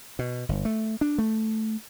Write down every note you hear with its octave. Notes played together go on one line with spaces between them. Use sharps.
B2
G1
A3
D4
A3